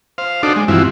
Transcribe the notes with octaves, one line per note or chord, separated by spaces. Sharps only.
C5 F5
D4 D#4 F#4 A4 C5 D5
G#3
G2 E3 F3 C4 E4 F#4